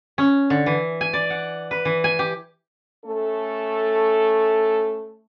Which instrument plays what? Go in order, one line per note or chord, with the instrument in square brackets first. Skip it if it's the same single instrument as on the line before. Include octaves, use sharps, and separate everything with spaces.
[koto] C#4
D3
E3
G#5
D5
F#5
B4
E3
G#5
G4
[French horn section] A3 C#4 A4